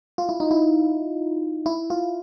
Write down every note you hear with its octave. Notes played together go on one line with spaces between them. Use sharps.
F4
E4
D#4
E4
E4
F4